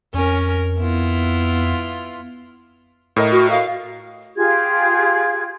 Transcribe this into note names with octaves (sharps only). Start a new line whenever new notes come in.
F2 C#4 A#4
B3 E4 F4
A2 A#4 D#5
F#4
F5
F4 G4 G#4 G#6